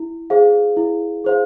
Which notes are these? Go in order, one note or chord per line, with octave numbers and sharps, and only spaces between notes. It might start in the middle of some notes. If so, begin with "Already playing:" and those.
Already playing: E4
G#4 C5 F5
E4
G#4 C5 F5